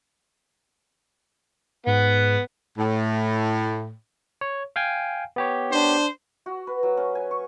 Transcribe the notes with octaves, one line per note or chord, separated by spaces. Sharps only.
G#2 B3 F#5
A2
C#5
F5 G5 G#5
B3 G4 C#5
D4 C5
F#4
B4
F#3
C#4
G#5
C#6